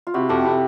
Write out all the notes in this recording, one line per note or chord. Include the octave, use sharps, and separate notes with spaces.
F4
C3 E4 F#4
F2 G4 A4
C3 E4